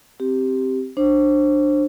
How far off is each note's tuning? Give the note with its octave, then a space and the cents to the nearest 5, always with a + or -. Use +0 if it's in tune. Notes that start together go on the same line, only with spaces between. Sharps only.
C4 +0 G4 -5
D4 +15 C5 +25